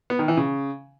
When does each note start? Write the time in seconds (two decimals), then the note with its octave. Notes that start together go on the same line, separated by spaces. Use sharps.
0.10 B3
0.19 D#3
0.28 E3
0.37 C#3